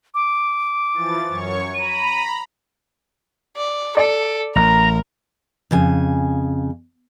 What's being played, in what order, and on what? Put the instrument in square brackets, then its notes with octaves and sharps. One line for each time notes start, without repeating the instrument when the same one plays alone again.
[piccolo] D6
[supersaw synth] E3 F3 A6
F#2 C#5 C#6
[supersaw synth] A#5 B5 [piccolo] D#7
[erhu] D5
[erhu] A4 [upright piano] D5
[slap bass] A1 [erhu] A#4 [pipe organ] A#5
[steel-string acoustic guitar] F2 C#3 G#5